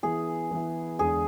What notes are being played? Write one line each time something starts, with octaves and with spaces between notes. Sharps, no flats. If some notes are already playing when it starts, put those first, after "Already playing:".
E3 B3 E4 G#4
E3 B3 E4
E2 D3 G#3 G#4